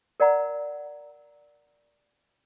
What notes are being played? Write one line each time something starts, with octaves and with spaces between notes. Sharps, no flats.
A#4 D5 F#5 A#5